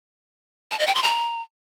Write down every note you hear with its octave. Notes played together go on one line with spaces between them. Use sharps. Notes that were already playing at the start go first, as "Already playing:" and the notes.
A5
D#5
G5
C6
A#5